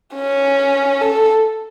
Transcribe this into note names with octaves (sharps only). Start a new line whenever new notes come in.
C#4
A4